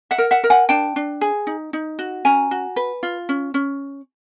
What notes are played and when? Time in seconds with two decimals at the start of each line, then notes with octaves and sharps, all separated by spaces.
0.11 E5 F#5
0.18 A#4
0.31 E5 F#5
0.44 A#4
0.50 F#5 G#5
0.69 D4 G5 A5
0.96 D4
1.21 G#4
1.47 D#4
1.73 D#4
1.99 F#4
2.25 C#4 G#5 A#5
2.51 F#4
2.76 B4
3.03 F4
3.29 C#4
3.54 C#4